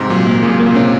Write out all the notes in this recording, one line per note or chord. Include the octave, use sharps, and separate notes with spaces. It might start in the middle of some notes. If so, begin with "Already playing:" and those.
Already playing: G#2 C3
A#2 F#3
A#2 A#3
A#2 C#3 F#3
A#3
A#2
C3 C#4